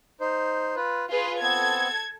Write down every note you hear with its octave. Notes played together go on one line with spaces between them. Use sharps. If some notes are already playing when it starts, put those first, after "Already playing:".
D#4 C5
F4 B4
F4 G#4 B4 C6
B3 C4 A4 G#6